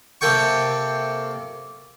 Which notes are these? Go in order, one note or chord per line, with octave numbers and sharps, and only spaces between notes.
C3 A#3 A4 G5 C#6